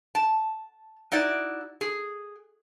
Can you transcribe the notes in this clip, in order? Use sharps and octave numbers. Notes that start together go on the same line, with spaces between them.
A5
D#4 E4 F#4 D5
G#4